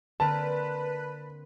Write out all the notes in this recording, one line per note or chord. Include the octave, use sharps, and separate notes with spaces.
D3 A#3 C4 B4 A5